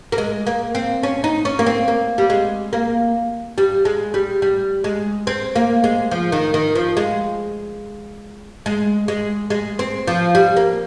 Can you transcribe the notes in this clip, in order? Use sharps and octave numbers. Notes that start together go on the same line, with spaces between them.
A#3
G#3
A#3
C4
C#4
D#4
C#4
A#3
C4
A#3
G3
G#3
A#3
G3
G#3
G3
G3
G#3
C4
A#3
G#3
F3
D#3
D#3
F3
G#3
G#3
G#3
G#3
C4
F3
G3
A#3